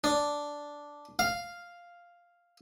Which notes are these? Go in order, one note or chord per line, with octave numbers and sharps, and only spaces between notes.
D4
F5